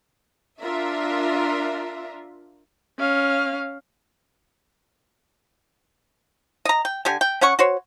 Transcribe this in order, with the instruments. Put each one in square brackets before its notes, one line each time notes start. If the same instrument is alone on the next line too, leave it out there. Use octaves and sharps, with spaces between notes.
[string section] D4 F4 A#4 E5
[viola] C#4 F5
[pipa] D#5 A#5
G5
D3 G4 G#5
G5
C#4 C#5 F#5 C#6
F#4 C5 C#5